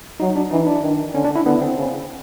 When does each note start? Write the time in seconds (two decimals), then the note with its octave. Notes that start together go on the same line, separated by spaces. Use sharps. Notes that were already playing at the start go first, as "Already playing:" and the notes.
0.20 F#3 D#4
0.36 D4
0.51 E3 D#4
0.67 D4
0.82 D#3
1.14 D3 C#4
1.25 D4
1.35 E4
1.45 D3 B3
1.62 C4
1.78 C#3